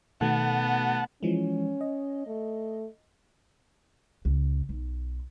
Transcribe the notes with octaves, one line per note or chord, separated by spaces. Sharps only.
B2 D#3 A3 B3 F#5 A5
E3 F3 G#3 C#4
D#5
A3
C#2
B1